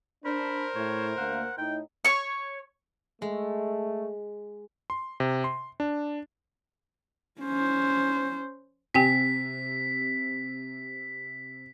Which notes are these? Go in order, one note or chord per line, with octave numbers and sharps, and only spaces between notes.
D4 A#4 C5 B5
A2 C#5
D2 A#3 F#5
A2 D#4 G5
C#5 C#6
G#3 A3
C6
C3
C6
D4
C#4 C5
C3 G4 G5 G#5 B6